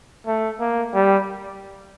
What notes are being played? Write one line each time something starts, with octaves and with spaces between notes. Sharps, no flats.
A3
A#3
G3